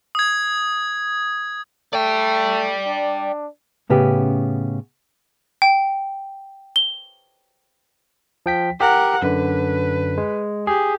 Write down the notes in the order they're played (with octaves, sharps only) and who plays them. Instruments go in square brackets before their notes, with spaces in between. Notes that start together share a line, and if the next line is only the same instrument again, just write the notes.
[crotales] D#6 G#6
[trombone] A3 [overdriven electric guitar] D5 G5
[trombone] D4
[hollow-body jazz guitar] A2 C#3 B3 C#4 G4
[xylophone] G5
G7
[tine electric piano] F3 G5 B6
[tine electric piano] G4 [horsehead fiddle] A#4 F#5
[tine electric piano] F#2 D3 [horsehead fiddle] B4
[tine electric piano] G#3
[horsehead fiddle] G4 [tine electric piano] G#4